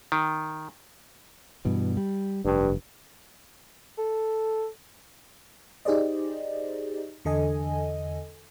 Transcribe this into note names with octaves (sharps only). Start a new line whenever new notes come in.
D#3
G2 B2 E3
G3
F1 G2
A4
D#4 G4 G#4 C5 D5 D#5
E2 D3 A4 D#5 G#5